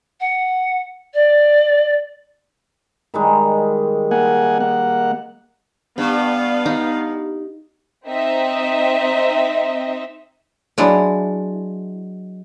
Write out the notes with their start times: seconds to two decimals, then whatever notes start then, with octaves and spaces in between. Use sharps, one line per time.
0.20 F#5
1.14 D5
3.14 D#3 G3 G#3
4.11 A#3 F#5 G#5
4.60 A#3 F#5
5.98 G2 B3 F5
6.66 D#4
8.07 C4 D#4 D#5 E5
10.78 F#3 G#3 D4 E4